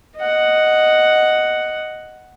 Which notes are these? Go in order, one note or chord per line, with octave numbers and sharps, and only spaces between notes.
D#5 F#5